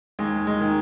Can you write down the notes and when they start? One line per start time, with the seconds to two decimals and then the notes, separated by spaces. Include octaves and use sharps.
0.19 D#2 G#3
0.47 G#3
0.61 D#3